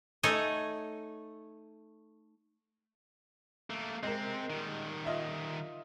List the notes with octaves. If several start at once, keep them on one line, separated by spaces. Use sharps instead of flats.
A3 D#4 A4 C#5 D#5 G#5
A3 A#3
C3 G#3 C4 A#4
D#3 G3
F4 D#5 E5